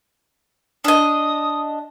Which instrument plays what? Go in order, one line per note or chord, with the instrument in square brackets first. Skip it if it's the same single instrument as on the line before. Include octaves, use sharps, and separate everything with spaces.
[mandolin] D4 D#5 [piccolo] D#6